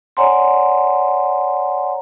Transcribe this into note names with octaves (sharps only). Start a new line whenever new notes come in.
C#5 D5 F#5 G#5 A#5 C6